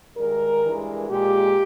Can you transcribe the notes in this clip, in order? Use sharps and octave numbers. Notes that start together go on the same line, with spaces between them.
G2 D#3 G#3 A#4
G2 E3 G#3
A#2 G#3 G4